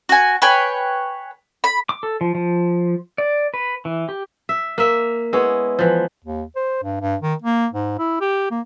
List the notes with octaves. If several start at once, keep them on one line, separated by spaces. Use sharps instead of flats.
F#4 G#5
B4 C#5 G5 G#5
B5
D6
A4
F3
F3
D5
B4
E3
G4
E5
A#3 E5
G#3 B3 E4 C#5
E3 F3
D#2
C5
G2
G2
D#3
A#3
G#2
E4
G4
A#3